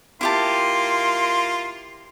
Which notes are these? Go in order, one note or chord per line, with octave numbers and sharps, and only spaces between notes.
A#3 E4 F4 G4 A5 C6